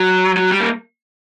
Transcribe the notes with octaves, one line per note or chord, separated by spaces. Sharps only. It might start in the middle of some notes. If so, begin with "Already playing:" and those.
Already playing: F#3
F#3
G3
A#3